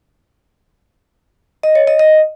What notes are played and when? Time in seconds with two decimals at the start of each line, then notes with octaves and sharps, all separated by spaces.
1.63 D#5
1.75 C#5
1.87 D#5
1.99 D#5